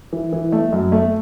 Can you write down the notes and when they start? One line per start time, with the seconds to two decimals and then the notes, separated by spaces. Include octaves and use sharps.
0.13 E3
0.33 E3
0.52 A3
0.72 F#2
0.92 A3